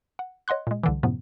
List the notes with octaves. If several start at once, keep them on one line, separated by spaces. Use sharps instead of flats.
F#5
C#5 D#5 F#5 C6 F#6
A#2 G#3
C2 D3 E3
F#2 A2 C3 F3 B3